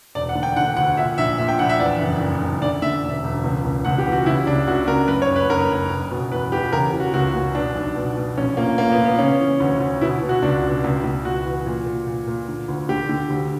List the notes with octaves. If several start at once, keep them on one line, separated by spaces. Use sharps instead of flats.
E1 D5
F#5
D3
G5
D3 F#5
D2 F#5
A#2 E5
A#1 E5
A#2 E5
G5
A#1 F#5
E5
E2 D5
F#1
F#1
F#1
D3 D5
D3 E5
E1
E1
C#2
C#2
C#2 F#5
G4
E3
F#4
C#3 E4
C#2 D4
C#2 F#4
C#3 A#4
F#2 B4
C#5
F#1
B4
F#1 A#4
F#1
F#1
B2
E2 B4
E2 G4
C#3 A#4
E3
F#4
C#2 F#4
C#3
B2 D4
B1
B2
B2
A#1 C#4
A#2 A#3
A#2 A#3
B3
A#2
B3
C#3 C#4
E3
D2
D2
B2 E4
B2
F#4
C#2 D4
B2
C#2
C#2
C#2 F#4
E3
A#2
A#2
A#2
A#2
D3
D2
D3 G4
D3
D2